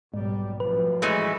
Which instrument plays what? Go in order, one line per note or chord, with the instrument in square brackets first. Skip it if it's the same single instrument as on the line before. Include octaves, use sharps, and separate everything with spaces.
[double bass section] B1 G3 [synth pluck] G#2
[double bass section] F#2 A2 F3 [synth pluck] B4
[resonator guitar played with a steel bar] E3 G#3 A3